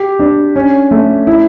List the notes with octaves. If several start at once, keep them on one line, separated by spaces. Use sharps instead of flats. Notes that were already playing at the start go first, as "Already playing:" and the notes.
Already playing: G4
D4
C#4
A3
E4